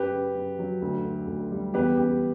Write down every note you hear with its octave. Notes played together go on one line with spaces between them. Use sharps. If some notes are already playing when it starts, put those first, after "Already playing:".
Already playing: F#2 G4 B4
C#3
F#2
F#3
D2
D3
D2
G3
E2 G4 B4
C#3 G4